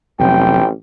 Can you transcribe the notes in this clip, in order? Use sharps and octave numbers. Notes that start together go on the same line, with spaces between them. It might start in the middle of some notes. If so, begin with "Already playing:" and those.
A1 F2 C3 F#3 G5